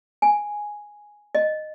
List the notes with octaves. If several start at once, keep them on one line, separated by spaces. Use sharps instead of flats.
G#5
D#5